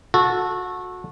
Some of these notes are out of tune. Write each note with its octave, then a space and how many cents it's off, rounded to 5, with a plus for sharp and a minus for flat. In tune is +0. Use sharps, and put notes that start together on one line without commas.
F#4 -25 A4 +0